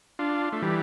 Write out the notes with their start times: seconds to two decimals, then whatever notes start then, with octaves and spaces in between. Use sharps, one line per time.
0.19 D4 F4
0.52 A3
0.62 E3 G3